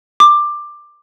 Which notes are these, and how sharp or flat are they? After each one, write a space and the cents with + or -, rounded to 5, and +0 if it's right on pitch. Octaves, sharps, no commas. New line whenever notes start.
D6 +15